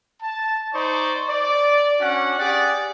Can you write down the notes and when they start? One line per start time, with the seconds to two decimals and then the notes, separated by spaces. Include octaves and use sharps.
0.22 A5
0.73 D#4 C5 D5 C#6
1.28 D5
2.00 C#4 D4 F#4 F#5
2.37 G4 G#4 D5 F#5